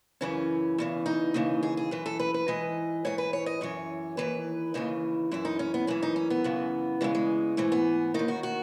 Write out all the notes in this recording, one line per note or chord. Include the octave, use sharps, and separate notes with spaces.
F#2 C#3 E3 C#4
E2 C#3 E3
D#4
D#2 C#3 E3
G#4
G#4
F#2 E3 B4
A4
B4
B4
G#2 E3 D#5
G#2 E3 C#5
B4
C#5
D#5
F#2 E3 C#5
D#2 C#3 E3 B4
D#2 C#3 E3 D#4
F#2 E3 E4
D#4
C#4
B3
F#2 E3 C#4
D#4
C#4
B3
F#2 C#3 E3
E2 C#3 E3 G#3
G#3
G#2 E3 A3
B3
D#2 D#3 D#4
F#4
F#4